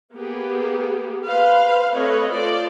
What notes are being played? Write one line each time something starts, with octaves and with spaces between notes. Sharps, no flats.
A#3 B3 G4 G#4
B4 C5 F5
A3 C4 A4 B4 C#5 D#5
F4 A4 C5 D5